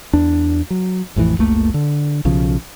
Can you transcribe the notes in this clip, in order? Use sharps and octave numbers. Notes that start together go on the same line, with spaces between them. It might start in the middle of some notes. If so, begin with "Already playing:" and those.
E2 D4
F#3
A1 F2 A2 E3
F#1 C#2 A3 A#3
D3
B1 C#3 F3